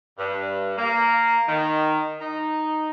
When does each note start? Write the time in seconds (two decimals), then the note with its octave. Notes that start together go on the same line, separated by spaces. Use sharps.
0.18 G2
0.78 A#3
1.48 D#3
2.20 D#4